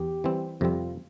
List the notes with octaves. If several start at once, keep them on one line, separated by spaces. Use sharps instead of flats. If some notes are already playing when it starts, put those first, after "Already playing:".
Already playing: E2 G4
E3 G3 C4
F2 C3 G3 C4 F4